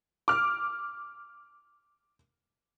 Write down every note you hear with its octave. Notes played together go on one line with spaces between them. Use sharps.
D6 F6